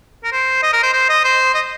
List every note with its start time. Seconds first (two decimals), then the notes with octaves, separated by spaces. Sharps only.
0.24 A#4
0.32 C5
0.62 D#5
0.73 A#4
0.83 C5
0.93 C5
1.09 D#5
1.24 C5
1.54 D#5